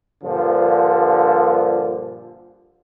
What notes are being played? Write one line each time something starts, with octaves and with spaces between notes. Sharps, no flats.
G2 A#2 D3 F3